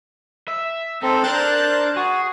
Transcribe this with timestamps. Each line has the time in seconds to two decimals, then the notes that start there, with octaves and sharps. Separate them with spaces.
0.48 E5
1.03 C4 D#4 A4 C5
1.24 D4 A#4 C5 F#6 G6 A6
1.96 F#4 G#4